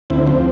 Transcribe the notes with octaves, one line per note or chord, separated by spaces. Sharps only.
D2 C4 E4
F3 C4